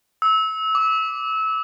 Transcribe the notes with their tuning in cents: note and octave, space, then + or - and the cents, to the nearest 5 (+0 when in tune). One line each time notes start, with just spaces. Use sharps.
E6 -25
D6 -5